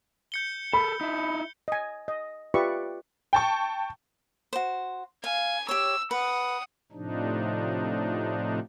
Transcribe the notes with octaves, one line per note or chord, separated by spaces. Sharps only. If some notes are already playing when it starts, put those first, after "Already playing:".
G6 C#7 G7
A4 A#4 B5
D#4 E4
D#5 G#5
D#5
F4 G4 B4 D5 E5 C#6
G5 A5 C#6
F#4 C5
F5 G#5
G4 C#5 E6
B4 F#5 D#6
A2 C3 F3 D4 D#4